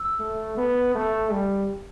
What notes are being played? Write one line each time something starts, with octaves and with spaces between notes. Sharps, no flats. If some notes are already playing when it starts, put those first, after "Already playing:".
Already playing: E6
A3
B3
A3
G3